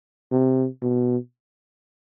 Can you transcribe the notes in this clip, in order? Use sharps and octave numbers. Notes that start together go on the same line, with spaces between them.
C3
B2